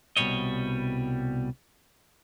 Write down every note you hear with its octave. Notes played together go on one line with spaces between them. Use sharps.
C2 B2 F3 G3 C#5 D#5